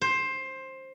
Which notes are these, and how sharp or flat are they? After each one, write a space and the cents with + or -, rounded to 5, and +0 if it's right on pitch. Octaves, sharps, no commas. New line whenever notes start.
C5 +15